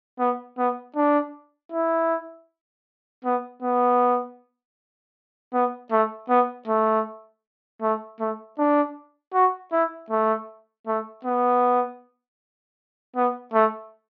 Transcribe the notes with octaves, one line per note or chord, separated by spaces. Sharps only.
B3
B3
D4
E4
B3
B3
B3
A3
B3
A3
A3
A3
D4
F#4
E4
A3
A3
B3
B3
A3